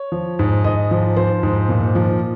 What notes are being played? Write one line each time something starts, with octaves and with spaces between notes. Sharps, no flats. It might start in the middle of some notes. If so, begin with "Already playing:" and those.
Already playing: C#5
F3
G#2
G#2 D#5
F3
F3 C5
G#2
A#2
F3